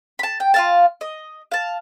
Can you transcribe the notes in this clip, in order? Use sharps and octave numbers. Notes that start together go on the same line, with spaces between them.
A5 B5
G5
F4 F5 A5
D#5
F5 A5